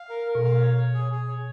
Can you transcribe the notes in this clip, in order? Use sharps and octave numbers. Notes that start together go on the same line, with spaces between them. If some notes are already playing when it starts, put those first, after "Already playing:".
Already playing: F5
A#4
A#4
B2
F5
C#5
C#5
G#4
G#4
C#5